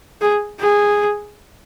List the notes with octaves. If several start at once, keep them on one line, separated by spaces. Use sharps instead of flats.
G#4
G#4